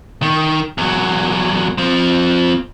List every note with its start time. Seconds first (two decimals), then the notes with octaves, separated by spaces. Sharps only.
0.22 D#3
0.78 E2 F#3
1.78 F3 C4